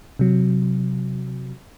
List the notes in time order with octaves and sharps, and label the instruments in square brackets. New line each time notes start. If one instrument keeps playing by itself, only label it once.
[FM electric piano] C3 F#3